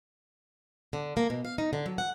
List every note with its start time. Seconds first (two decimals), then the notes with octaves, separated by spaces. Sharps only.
0.93 D3
1.17 A#3
1.30 B2
1.45 F5
1.58 D#4
1.73 D3
1.86 F#3
1.98 F#5